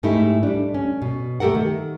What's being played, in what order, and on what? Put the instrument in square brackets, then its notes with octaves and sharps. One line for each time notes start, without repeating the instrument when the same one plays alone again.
[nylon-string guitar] G#2 A3 D#4 E4 G4
G3 D4
C#4
B2
A3 G4 A4 A#4 F#5
D#3